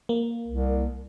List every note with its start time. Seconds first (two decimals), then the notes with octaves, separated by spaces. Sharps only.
0.09 A#3
0.48 C2